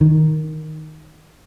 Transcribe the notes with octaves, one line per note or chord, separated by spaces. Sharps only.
D#3